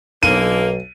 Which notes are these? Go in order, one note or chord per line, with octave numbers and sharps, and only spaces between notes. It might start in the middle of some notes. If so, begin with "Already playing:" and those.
B1 D3 E3 A#3 D#7